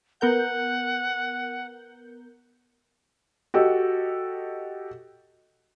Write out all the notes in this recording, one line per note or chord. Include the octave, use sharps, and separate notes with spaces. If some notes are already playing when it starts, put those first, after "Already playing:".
B3 A#4 F#5 G6
F#4 G4 A4 D#5